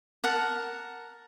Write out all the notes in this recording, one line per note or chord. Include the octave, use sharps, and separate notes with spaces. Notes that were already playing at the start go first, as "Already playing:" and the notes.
A#4 F#5 A5